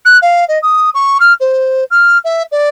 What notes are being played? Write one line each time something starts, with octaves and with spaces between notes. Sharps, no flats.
F#6
F5
D#5
D#6
C#6
F6
C5
F6
E5
D5